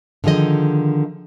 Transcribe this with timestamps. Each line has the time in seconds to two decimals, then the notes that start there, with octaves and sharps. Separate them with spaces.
0.24 D3 D#3 F3 G#4 D#5